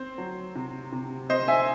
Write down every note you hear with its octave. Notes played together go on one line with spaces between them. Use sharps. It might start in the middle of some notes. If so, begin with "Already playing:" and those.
Already playing: C4 C5
F#3
C3
C3
C4 C5 D#5
E5 G#5